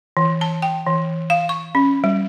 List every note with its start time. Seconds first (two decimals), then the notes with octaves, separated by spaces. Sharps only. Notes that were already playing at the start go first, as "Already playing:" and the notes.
0.17 E3
0.41 A5
0.62 G5
0.86 E3
1.30 F5
1.49 C#6
1.75 C#4
2.04 G3